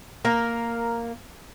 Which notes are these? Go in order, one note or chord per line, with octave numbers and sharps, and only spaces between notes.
A#3 A#4